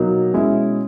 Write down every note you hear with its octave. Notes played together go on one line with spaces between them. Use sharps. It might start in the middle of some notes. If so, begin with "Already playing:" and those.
Already playing: B2 F#3 A#3 D#4
B2 G#3 C#4 E4